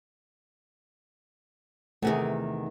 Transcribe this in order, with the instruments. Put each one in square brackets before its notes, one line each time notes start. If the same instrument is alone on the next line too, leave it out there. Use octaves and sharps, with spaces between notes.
[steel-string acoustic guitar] E2 C3 D#3 [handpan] A3 G#4